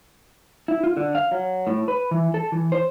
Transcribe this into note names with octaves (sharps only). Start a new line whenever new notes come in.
E4
F4
D3
F5
F#3
A2
B4
E3
A4
E3
C5